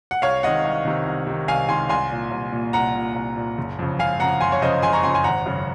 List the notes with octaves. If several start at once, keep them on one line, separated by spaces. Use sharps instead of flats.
F#5
C2 C#5 F5
C3 D#3 D#5 F#5
C2
C3 D#3
C2
C3 D#3
C2 F5 G#5
C3 D#3 G#5 C6
C2 G#5 C6
A#2
C2
A#2
C2 F#5 A#5
A#2
C2
A#2
F#1
F2 C#3
F#1 F5 G#5
F2 C#3 F#5 A#5
F#1 G#5 C6
C#5
F2 C#3 C5 D#5
F#1 G#5 C6
A#5 C#6
F2 C#3 G#5 C6
G#5 C6
G#1 F#5 A#5
F#2 C#3